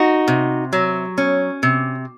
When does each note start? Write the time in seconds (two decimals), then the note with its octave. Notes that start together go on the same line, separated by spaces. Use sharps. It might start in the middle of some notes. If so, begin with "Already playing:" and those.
Already playing: D#4 F#4
0.28 C3
0.73 F#3
1.18 C#4
1.63 C3